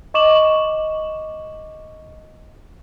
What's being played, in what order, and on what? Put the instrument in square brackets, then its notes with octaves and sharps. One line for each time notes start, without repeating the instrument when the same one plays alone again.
[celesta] D#5 C#6 D6 E7 F#7